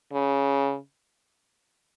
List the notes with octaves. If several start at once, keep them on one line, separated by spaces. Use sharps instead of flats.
C#3